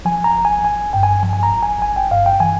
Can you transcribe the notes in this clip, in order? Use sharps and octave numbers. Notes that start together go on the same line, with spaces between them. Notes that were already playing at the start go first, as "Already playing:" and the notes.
F3 G#5
A#5
G1
G#5
G1 G#5
G2 G5
G#5
F3 G#5
G#5
A#5
G1
G#5
G1 G#5
G5
G2 F5
G5
E3 G#5